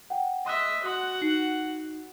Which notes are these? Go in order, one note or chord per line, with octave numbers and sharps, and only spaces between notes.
F#5 G5
D#5 E5 C6 F#6
F#4 F#5 C6 D#6 F#6
D#4 C7